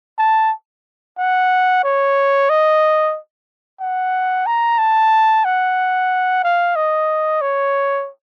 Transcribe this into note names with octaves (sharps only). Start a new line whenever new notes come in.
A5
F#5
C#5
D#5
F#5
A#5
A5
F#5
F5
D#5
C#5